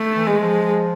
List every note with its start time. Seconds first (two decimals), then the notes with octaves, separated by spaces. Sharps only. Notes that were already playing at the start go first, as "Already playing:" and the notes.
Already playing: A3
0.13 E3
0.27 G#3
0.41 F3